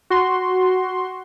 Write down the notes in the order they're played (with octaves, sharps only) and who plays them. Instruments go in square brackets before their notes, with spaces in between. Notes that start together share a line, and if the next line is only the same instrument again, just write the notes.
[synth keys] F#4 C6